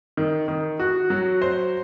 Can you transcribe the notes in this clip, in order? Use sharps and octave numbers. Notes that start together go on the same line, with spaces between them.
D#3
D#3
F#4
F#3
C5